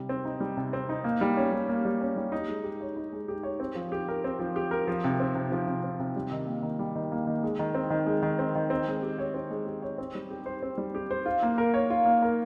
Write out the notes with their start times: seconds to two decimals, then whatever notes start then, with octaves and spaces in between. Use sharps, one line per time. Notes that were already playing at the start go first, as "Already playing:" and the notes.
Already playing: C3 G3
0.09 C4
0.25 D#4
0.40 G3
0.57 C3
0.73 C4
0.89 D#4
1.04 A#3
1.21 G3
1.37 C#4
1.52 G3
1.69 A#3
1.85 G3
2.01 C#4
2.16 G3
2.32 D#4
2.48 G#3
2.64 G4
2.81 C#5
2.97 D#4
3.13 G#3
3.28 G4
3.43 C#5
3.60 C4
3.75 F3
3.92 G4
4.08 A#4
4.24 C4
4.39 F3
4.56 G4
4.71 A#4
4.87 F3
5.04 C3
5.20 C4
5.35 C3
5.52 F3
5.67 C3
5.84 C4
6.00 C3
6.16 G3
6.32 D#3
6.47 A#3
6.63 D#3
6.79 G3
6.96 D#3
7.12 A#3
7.27 D#3
7.43 G#3
7.59 D#3
7.75 C4
7.90 D#3
8.06 G#3
8.23 D#3
8.39 C4
8.55 D#3
8.70 C4
8.87 G#3
9.03 G4
9.18 C#5
9.34 C4
9.51 G#3
9.67 G4
9.82 C#5
9.98 C4
10.15 G3
10.30 G4
10.46 C5
10.63 C4
10.78 G3
10.95 G4
11.11 C5
11.26 F4
11.43 A#3
11.58 A#4
11.74 C#5
11.90 F4
12.05 A#3
12.22 A#4